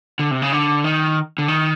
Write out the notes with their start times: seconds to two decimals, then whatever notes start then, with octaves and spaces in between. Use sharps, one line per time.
0.19 D3
0.31 C3
0.42 C#3
0.52 D3
0.84 D#3
1.38 D3
1.48 D#3